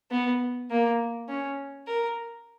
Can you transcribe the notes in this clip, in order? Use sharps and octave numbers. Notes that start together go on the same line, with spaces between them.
B3
A#3
C#4
A#4